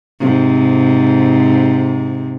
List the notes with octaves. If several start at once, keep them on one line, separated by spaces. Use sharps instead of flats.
G#2 C3